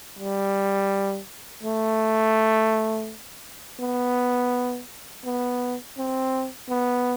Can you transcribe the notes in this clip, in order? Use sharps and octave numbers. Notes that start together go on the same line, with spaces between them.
G3
A3
B3
B3
C4
B3